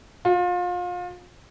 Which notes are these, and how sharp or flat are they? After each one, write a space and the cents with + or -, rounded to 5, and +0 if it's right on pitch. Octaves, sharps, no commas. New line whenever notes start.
F4 +30